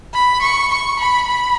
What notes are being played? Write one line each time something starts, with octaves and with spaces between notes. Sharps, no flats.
B5
C#6
C#6
B5
B5